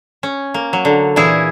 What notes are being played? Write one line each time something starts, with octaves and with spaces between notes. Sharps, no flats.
C#4
A#3
F#3
D3
A#2 E3 E4 G#4